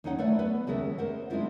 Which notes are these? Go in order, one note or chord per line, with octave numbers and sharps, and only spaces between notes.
D#2 D3 C#4 D#4 C#5 F#5
A3 B4 C#5 D5 F#5
B3 B4
D#2 C#3 G#3 A4 A#4 E5
A#4 C5 C#5 F#5
G#3 A#3 C4 D4 E4 F4